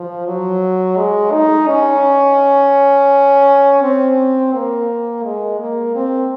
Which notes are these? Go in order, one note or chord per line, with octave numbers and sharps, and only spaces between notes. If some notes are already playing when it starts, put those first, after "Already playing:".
Already playing: F3
F#3
G#3
D#4
C#4
C4
A#3
G#3
A#3
C4